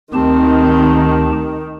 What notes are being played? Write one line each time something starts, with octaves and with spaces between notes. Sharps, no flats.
D2 D#3 C4 G4 A5